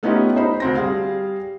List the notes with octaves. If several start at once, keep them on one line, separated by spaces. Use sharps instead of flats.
A3 B3 C#4 D#4 F4 G4
D#4 C5 B5
D2 C4 A#6
G3 G#4 F5